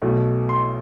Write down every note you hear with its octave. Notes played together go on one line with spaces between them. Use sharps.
B1 B2 A3
C6